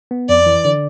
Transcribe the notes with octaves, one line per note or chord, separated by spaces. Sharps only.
B3
F2 D5
E3
D3